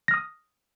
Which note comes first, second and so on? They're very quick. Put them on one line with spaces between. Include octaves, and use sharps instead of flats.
A#6 F6 D#6